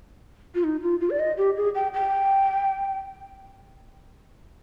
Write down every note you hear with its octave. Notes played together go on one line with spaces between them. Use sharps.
F4
D#4
F4
F4
D5
D#5
G4
G#4
G5
G5